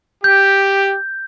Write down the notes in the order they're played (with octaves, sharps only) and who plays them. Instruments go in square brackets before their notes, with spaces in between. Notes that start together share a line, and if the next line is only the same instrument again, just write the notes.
[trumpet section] G4 [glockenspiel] G6